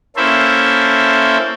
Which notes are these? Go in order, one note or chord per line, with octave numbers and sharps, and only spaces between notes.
A#3 C#4 E4 A4 C5 E5